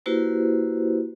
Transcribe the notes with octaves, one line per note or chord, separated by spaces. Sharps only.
A#3 E4 F#4 G4 B4 C5